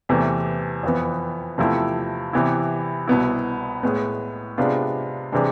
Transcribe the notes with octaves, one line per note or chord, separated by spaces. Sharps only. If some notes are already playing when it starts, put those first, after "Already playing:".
E2 C3 E3 A3
F2 E3 B3
E2 C3 F3 A3 E4
C3 E3 B3 E4
C2 B2 B3 E4
A2 G#3 B3
C3 G#3 B3 D4 F4
C3 E3 G#3 D4